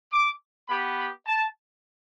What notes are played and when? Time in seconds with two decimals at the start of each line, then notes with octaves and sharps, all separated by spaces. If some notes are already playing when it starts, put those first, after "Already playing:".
0.12 D6
0.69 B3 G4 B5
0.98 B5
1.27 A5